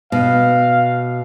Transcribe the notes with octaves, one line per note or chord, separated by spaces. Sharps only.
B2 F5